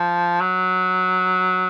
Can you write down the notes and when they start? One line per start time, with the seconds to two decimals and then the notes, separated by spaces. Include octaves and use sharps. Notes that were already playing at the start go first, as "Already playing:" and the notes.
Already playing: F3
0.41 F#3